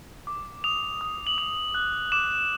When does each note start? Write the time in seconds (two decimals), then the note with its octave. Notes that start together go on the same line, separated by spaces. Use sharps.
0.27 D6
0.64 D#6 F7
1.01 D#6
1.27 F#7
1.38 D#6 F7
1.75 F#6
2.12 D6 E7